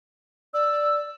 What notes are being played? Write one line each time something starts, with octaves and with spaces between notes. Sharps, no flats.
D5 E6